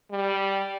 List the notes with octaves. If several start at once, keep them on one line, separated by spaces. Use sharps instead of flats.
G3